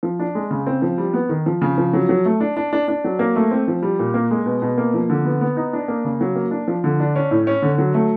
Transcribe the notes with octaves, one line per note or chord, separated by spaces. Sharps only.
F3
D4
G#3
C#3
C4
F3
G3
B3
D#3
F3
C#3
F3
F#3
F#3
A3
D4
D4
D4
D4
F#3
A#3
A3
C4
F3
G3
A#2
A#3
G#3
B2
B2
A#3
F3
D3
B3
B3
D#4
D4
A#3
C#3
F#3
A#3
D4
F3
D3
D4
C#4
A2
C#4
D3
F#3
A3